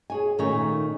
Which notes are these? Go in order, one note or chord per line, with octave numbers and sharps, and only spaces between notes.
G#4 C#5 G#5
A#2 D#3 A3 C#4 D#4 C#5